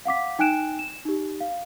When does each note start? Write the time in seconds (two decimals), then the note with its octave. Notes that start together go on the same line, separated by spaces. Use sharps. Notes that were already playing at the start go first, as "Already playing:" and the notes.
0.05 F5 F#5 D6 B6
0.39 D#4 G5 G#5 F#6 D7 E7
0.79 E7
1.05 D#4 G4
1.40 F5